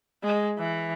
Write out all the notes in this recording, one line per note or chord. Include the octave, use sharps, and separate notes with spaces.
G#3
E3